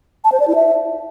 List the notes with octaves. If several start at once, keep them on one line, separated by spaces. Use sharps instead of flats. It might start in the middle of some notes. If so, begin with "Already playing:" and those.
A5
C5
D5
E4
E5